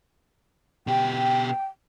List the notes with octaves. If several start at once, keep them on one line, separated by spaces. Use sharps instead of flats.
B2 G4 G5